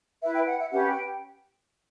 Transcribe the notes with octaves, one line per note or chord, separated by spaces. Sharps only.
E4 B4 E5
G5
F#5
E5
C#4 G4 B4 F#5
G5